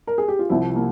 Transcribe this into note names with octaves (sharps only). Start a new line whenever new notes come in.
A#4
G#4
G4
F4
C2 C3 F3 E4
A#3